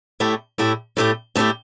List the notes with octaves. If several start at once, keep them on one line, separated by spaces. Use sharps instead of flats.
A2 A3 E4 G4
A2 A3 E4 G4
A2 A3 E4 G4
A2 A3 E4 G4